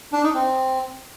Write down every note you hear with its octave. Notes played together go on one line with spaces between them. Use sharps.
D4
D#4
C4